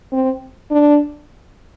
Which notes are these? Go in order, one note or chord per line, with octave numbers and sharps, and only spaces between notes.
C4
D4